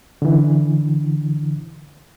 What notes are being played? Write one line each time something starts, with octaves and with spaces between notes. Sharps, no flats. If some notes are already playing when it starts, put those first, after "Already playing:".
D3 E3